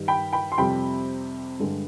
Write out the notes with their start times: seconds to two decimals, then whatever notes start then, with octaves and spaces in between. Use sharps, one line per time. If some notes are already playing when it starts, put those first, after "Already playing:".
Already playing: G2 D#3 G3
0.08 G5 B5
0.33 G5 B5
0.52 C6
0.58 F2 C3 G3 G5 B5
1.59 G2 D3 G#3